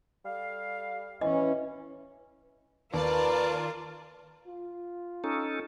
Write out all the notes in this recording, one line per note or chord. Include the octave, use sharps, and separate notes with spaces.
G3 A4 F5
E3 C#4 D#5
D#2 F4 A#4 B4 D5 A5
F4
C#4 D#4 A4